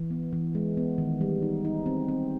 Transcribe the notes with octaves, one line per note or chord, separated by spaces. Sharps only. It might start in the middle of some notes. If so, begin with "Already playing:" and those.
Already playing: E3
B3
E3
G#3
B3
D#3
G3
D#4
D#4
C4
C4